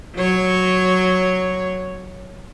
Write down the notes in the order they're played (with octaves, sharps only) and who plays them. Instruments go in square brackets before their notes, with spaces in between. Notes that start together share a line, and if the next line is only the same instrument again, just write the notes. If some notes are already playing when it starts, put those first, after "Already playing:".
[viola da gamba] F#3 C#5